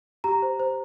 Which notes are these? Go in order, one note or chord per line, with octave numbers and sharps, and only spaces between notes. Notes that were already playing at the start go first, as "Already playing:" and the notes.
G4 A#5
C5
C5